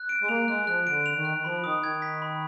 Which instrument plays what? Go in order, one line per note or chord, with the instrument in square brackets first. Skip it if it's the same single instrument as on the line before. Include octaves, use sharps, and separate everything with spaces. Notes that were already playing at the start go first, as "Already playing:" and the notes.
Already playing: [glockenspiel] F#6
D7
[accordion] G#3
[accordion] A#3 [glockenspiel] F7
[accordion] G#3 [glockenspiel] F#6
[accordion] F3 [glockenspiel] F#6
[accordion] D3 [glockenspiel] D7
[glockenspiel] F7
[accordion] D#3
[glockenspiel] F#6
[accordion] D#3
[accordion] F3 [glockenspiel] B5
[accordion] D#3 [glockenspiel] D#6
[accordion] D#3 [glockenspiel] G#6
[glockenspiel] B6
B5